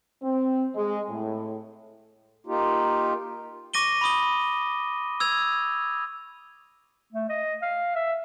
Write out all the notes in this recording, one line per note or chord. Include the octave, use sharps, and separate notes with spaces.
C4
G#3
A2
A#3 D#4 F4 G4
C#6 D6 A#6 D#7 G7
B5 C#6 D#6 G7
E6 G#6 F7
A3
D#5
F5
E5